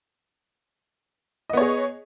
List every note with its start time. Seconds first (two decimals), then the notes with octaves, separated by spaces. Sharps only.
1.50 D#5
1.53 B3
1.57 C#5
1.61 G#4